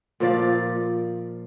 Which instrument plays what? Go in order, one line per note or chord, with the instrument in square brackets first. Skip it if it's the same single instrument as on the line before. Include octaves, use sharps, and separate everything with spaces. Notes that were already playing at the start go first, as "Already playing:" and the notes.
[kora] A#2 F3 D5 F5